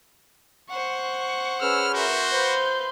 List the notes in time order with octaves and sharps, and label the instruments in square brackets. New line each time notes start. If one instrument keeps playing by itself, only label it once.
[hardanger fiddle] C5 F#5 [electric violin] C#6
[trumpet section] C#4 G#4 B4 [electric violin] E6 [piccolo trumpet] F6
[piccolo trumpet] F#4 [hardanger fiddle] A#4 E5 [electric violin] C6 G6
[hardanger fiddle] B4 F5 [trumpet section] C5